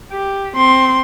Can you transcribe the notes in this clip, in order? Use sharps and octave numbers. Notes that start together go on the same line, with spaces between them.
G4
C4 C6